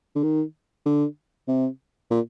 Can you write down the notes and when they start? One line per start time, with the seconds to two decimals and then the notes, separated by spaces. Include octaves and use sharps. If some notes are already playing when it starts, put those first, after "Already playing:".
0.16 D3
0.23 D#3
0.86 D3
1.48 C3
2.11 A#2